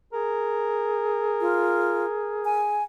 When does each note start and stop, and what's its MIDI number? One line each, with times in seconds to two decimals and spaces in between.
0.13 2.82 68
0.13 2.65 70
1.41 2.05 65
2.45 2.83 80